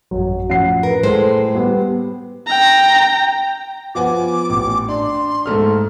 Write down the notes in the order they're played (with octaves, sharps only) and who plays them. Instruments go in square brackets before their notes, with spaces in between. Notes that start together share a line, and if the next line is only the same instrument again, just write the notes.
[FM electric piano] A1 F#2 [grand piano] F#3
[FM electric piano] A2 F3 C#4 [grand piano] F#5 C7
[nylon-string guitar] A#4 [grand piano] B4
[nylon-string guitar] A2 G#3 C5 [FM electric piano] A4
[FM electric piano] G3 [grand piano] B3 G4
[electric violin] G5 A#5
[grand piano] F3 B3 G#5 [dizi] D6
[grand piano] A1
[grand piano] D4 [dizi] C6
[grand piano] G#2 A3 F6